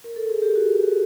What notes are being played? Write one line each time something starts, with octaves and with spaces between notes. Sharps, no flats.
A#4
A4
G#4
G4
F#4